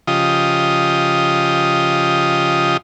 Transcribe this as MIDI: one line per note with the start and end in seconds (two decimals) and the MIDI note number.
0.07 2.77 49
0.07 2.77 53
0.07 2.77 65
0.07 2.77 67
0.07 2.77 75
0.07 2.77 87